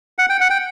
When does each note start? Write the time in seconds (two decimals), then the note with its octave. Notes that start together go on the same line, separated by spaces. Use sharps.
0.18 F#5
0.30 G5
0.40 F#5
0.50 G5